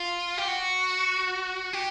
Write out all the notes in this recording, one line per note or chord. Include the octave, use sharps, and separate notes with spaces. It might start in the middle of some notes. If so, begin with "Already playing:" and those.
Already playing: F4
G4
F#4
G4